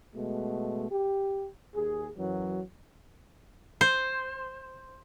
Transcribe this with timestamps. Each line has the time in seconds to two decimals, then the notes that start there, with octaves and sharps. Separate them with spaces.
0.15 B2 G#3 A3
0.91 G4
1.75 D#2 G#4
2.18 F#2 E3 F#3
3.81 C5